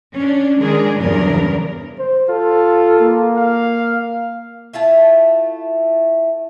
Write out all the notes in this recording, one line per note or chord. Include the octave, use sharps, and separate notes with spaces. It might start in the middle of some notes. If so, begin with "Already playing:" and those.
C#4 D4
D#3 G#3 D4 G#4 A#4
E2 G2 C#3 F#3 D4 A#4
C5
F4 A4
A#3
F5
A3 E4 F4 A5